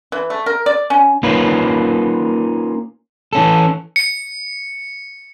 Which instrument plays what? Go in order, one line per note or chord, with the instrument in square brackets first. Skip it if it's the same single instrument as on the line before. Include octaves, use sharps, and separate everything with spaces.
[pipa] E3
A3
A#4
D5
C#4
[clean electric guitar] A#3 C#4 D#4 F4 B4
E3 C#4 A4
[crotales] C#7